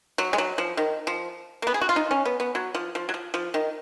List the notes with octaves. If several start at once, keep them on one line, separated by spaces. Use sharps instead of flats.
F#3
G#3
F#3
F3
D#3
F3
A#3
B3
G#4
F#4
F4
D#4
C#4
B3
B3
F#3
F3
F3
F#3
F3
F3
D#3